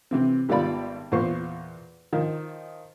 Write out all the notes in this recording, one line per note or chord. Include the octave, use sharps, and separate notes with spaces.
C3 E3 C4
G#1 G3 B3 F4 D5 B5
E2 A#2 F4 C5 C#6
D#3 F3